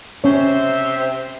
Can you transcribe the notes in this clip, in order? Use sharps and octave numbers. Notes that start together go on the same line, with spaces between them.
C3 C#4 C5 C#5 E5